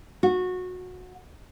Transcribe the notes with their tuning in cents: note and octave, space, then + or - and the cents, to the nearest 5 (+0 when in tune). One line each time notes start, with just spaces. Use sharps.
F#4 -20